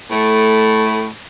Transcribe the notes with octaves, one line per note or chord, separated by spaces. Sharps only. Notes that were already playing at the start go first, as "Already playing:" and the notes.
A2 A3